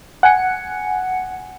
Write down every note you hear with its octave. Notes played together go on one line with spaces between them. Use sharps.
F#5 G#5 C#7